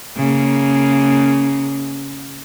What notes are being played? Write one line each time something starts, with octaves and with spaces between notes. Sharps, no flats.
C#3 A#3